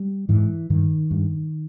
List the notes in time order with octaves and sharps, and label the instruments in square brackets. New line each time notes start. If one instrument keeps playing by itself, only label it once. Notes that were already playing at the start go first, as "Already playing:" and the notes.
Already playing: [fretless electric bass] G3
G#2 E3
G2 D#3
G2